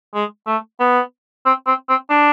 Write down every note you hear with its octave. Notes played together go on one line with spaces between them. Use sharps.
G#3
A3
B3
C4
C4
C4
D4